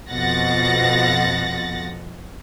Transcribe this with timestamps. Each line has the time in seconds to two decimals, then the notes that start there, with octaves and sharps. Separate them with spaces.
0.11 F2 B2 F3 F#5 A6 A#6